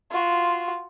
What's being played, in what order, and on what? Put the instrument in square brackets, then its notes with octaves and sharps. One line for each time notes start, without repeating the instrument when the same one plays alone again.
[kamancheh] F4 F#4